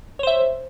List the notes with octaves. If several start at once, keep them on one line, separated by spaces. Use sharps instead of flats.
C5 C#5 E5